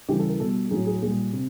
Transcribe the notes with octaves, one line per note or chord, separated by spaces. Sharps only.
C#3 E3 G3 G4
A4
A#4
B2 G3 A4
A2 F#3 G#4
G#4
A#2 G3 G#4
C3